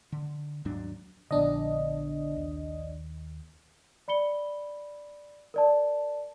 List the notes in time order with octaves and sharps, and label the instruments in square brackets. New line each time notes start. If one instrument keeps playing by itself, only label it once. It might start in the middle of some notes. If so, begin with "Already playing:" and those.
[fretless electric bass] D3
D#2 G#2 F#3 D4
[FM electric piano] A#1 D4 D#5 [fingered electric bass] D3 B3
[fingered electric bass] D#2
[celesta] D5 B5 C#7 G7
A#4 D5 A5